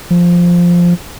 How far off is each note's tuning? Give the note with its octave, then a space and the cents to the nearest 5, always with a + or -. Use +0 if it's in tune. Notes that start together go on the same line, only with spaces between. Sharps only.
F3 +0